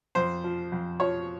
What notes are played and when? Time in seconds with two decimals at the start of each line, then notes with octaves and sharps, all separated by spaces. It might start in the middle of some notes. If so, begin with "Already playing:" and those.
0.15 F2 C5
0.44 F3
0.72 F2
1.00 F3 C#5